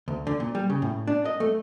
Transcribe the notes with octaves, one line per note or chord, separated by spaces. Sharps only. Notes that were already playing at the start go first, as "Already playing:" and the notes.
D2
D3
A#2
G3
C#3
A2
D4
D#5
A3